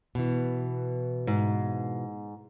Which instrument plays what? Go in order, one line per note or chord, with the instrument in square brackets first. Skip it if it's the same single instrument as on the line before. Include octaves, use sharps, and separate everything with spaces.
[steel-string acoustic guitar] B2 E3
[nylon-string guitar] G#2